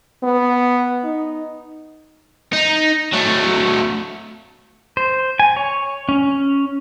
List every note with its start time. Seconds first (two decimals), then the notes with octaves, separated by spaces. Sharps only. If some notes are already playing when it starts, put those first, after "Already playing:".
0.23 B3
1.04 D#4
2.53 D#4
3.13 F#3 A3
4.97 C5
5.40 G#5
5.56 C#5
6.09 C#4